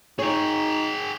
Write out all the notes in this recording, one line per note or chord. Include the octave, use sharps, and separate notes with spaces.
D#4 G#4 C#5 G5